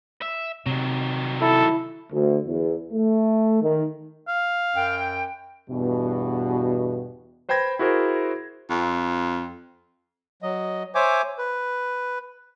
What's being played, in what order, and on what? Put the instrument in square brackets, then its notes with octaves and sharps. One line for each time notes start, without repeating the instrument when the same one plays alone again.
[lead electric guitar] E5
[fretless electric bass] C3 [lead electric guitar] D#3 F#3
[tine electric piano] E4 [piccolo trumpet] A4
[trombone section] D2
E2
A3
D#3
[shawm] F5
[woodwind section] F#2 G5
[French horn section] E2 G2 B2
[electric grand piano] B4 C5 G5 B5 G#6 A#6
E4 F#4 G#4 A#4 C5
[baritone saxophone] F2
[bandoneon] F#3 D#5
C5 C#5 E5 G#5 D6
B4